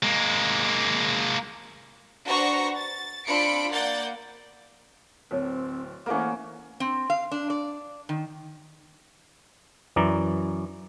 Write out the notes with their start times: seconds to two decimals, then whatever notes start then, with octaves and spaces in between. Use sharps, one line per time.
0.03 G#3 A#3
2.25 D4 F#4 B4 C5 A#5 C#6
2.78 A6
3.27 C4 D4 F4 B5 C#7 D7
3.71 A#3 D5 F#5 G6 A6
5.31 D1 C4 A#4 C#5 A5
6.06 E3 A3 A#3 C#4 A#4 F#5 D6
6.80 C4
7.10 F5
7.32 D4
7.50 D5
8.09 D#3
9.96 F#2 E3 D5 A#5